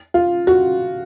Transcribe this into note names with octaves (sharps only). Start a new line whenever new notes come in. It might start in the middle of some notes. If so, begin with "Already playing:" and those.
F4
F#4